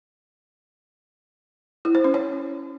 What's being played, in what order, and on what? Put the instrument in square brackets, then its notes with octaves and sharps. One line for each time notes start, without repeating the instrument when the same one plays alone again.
[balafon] E4
C5
C#4
C#5